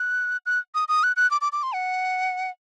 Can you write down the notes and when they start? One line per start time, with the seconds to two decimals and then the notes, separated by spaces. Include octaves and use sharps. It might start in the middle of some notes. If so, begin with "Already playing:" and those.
Already playing: F#6
0.46 F#6
0.75 D#6
0.88 D#6
1.03 F#6
1.16 F#6
1.31 D6
1.41 D6
1.53 D6
1.63 C6
1.74 F#5